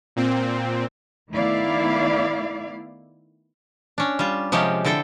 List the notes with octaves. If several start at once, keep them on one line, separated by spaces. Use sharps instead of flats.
A#2 C4
D#3 A3 B3 E4 D5 F5
C#4 D4
G3 F4
C3 F3 G#3 C#4 G4
D3 E4 A4 G5